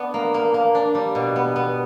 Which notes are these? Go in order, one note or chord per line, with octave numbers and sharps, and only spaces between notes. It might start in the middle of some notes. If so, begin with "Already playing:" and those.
Already playing: B3 D4
A#3
A#3
A#3
D4
G3
B2
B3
B3